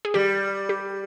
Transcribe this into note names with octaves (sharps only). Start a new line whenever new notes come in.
G#4
G3 G4
G4